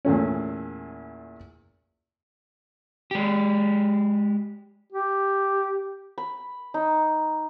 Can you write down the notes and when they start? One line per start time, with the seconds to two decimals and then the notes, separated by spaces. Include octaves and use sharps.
0.05 E2 A#2 A3 C#4
3.11 G#3 G4
4.92 G4
6.18 B5
6.74 D#4